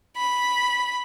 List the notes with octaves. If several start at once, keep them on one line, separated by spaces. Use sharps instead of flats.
B5